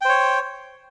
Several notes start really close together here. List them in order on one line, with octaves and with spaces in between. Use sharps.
G5 C5 C#5